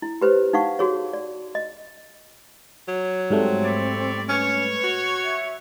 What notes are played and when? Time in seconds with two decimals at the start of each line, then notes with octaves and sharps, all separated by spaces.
0.02 E4
0.21 G4 B4 C5
0.53 D#4 F5 F#5 C#6
0.79 F#4 G#4 C#5
1.13 D5
1.55 D#5
2.88 F#3
3.30 G#2 G3 A3 C4
3.63 E4 C#5 D5
4.29 C#4 B4 C#5
4.84 F#4
5.24 E5